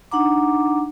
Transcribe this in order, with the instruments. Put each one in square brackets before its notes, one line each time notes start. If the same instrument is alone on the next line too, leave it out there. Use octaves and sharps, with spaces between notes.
[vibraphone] D4 D#4 F#5 A#5 D6